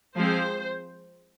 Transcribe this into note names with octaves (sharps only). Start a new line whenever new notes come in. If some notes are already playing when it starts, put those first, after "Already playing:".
F3 G#3 C4 C5